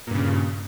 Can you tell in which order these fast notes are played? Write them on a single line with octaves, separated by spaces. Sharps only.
A#2 G2 C#3